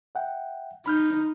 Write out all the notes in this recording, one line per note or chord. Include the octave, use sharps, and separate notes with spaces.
E5 F#5 G5
D#4 B5 F6 G6